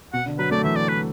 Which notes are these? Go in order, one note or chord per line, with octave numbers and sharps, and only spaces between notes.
B2 F#5
D3
F#3 B4
A3 D5
E3 E5
D5
B4